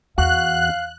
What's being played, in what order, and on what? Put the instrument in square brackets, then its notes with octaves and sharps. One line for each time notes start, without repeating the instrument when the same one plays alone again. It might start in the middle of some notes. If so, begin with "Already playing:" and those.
[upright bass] E2 [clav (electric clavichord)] F#4 [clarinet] F5 [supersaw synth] F#6